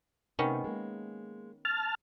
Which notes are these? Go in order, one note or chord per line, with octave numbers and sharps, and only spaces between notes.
C3 D#3 A3 B3 C#4 D#4
G#3 A#3
A5 F6